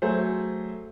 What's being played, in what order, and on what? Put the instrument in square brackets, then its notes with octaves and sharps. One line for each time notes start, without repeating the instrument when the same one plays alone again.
[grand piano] F#3 A3 G#4 C5